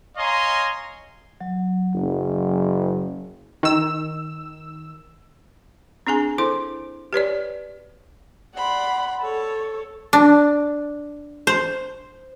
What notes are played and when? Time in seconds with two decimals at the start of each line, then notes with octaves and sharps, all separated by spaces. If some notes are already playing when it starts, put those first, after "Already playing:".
0.17 C#5 D#5 F5 G#5 A#5 C6
1.41 F#3
1.95 F#1
3.63 D#3 E6
6.07 C4 D4 G#4 G#5
6.38 E4 A4 C5 C6
7.13 G4 B4 C#5 D5
8.56 D5 F#5 B5 C6
9.21 A4 C#5
10.13 D4
11.47 C5